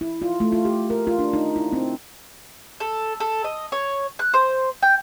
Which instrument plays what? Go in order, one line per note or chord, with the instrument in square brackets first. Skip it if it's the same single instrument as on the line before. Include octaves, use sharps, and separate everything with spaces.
[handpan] E4
F4
A3
F4
G4
A#4
F4
D4
D#4
E4
C4
[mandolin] A4
A4
D#5
C#5
F#6
C5
G5